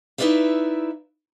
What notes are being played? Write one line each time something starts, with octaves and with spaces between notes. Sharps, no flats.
D#4 E4 B4 D5 E5 F5